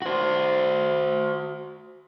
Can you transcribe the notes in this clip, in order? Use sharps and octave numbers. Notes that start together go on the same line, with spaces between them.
F#4 C5